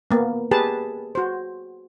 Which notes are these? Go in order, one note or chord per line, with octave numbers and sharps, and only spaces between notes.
A#3 B3
G4 G#4 B4 A5
F#4 C5